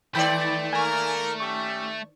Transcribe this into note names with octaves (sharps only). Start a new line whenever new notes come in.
D#3 A3 C5 D5 G5 B5 B6
A#3 A#4 G#5 C#6
C#4 G4 E5 C#6